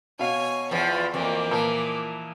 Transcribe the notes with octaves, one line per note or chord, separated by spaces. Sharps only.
B2 C#5 F5 G#5
E2 E3 F3 B5
F2 E3 A#3 D5
A#2 E3 F3